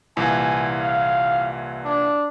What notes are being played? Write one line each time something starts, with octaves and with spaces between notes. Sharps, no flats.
C2 A#2 E3 G#5
F5
D4